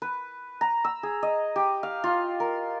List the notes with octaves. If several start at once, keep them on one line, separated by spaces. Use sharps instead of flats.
B4
A#5
E6
G#4
D#5
G4
F5
F4
A#4